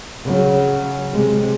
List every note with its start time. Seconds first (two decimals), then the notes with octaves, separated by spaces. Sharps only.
0.24 C#3 F#3
1.14 C3 G#3